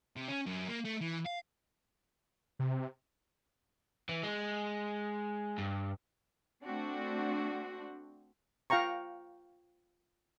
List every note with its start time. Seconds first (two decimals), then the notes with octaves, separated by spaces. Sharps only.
0.17 C3
0.29 C#4
0.46 F#2
0.68 A#3
0.85 A3
1.01 E3
1.26 F5
2.59 C3
4.09 E3
4.23 G#3
5.58 G2
6.64 A3 C4 D4 F#4
8.70 F4 F5 G5 A#5 C#6